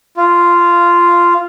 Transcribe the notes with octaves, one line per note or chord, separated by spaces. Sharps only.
F4